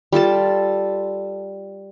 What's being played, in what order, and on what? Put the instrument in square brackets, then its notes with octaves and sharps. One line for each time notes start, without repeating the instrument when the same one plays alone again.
[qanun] G3 F4 A4 A5